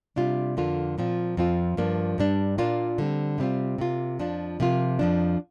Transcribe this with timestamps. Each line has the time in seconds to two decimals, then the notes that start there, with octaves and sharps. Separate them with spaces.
0.16 C3 G3 D4 F4
0.57 F2 D3 A#3 D4 F4
0.98 A#2 F3 C4 F4
1.37 F2 F3 C4 F4
1.77 G2 F3 A#3 D4
2.18 G2 G3 D4
2.58 A#2 A#3 D4 F4
2.98 D3 G3 C4
3.38 C3 G3 C4 F4
3.78 C3 A#3 F4
4.19 F2 F3 D4 F4
4.60 C3 F3 A#3 F4
4.99 F2 F3 D4